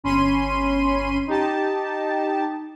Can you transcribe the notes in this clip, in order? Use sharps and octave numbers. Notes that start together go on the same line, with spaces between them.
G1 C#4 B5 C6 D#7
D#4 G4 A5